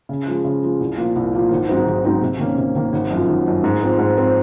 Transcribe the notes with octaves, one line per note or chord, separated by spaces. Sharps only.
C#3
F3 G#3
C#3
F3 G#3
C2
A#2 F3 A#3
C2
A#2 F3 A#3
G#1
G#2 F#3 C4 D#4
G#1
G#2 F#3 C4 D#4
C3
D#3 A#3 C#4
C3
D#3 A#3 C#4
G#1
F#2 F3
G#1
F#2 F3
G#2
F3 C4
G#2
F3 C4